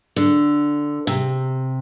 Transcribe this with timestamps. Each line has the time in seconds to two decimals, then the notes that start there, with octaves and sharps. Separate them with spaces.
0.16 D3
1.07 C3